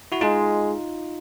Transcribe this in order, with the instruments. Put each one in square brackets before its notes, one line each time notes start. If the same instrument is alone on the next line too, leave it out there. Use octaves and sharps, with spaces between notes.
[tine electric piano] E4 F#4
[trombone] G#3 [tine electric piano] D#4 F4